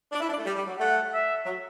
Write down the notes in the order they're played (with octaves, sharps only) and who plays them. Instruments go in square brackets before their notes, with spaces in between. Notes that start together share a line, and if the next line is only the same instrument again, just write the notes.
[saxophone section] D4
E4
D4
A3
G3
G3
F#3
[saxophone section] A3 [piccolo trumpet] F#5
[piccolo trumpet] E5
[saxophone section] F#3